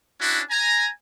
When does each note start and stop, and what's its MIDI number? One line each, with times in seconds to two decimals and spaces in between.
0.21 0.40 61
0.21 0.40 62
0.21 0.40 64
0.21 0.40 66
0.50 0.89 80
0.50 0.89 82